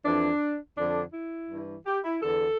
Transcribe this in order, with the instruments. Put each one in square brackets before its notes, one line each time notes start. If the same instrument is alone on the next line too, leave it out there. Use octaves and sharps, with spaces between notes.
[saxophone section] F2 E3 D4
F2 D3 D4
E4
G2 E3
G4
E4
E2 D3 A4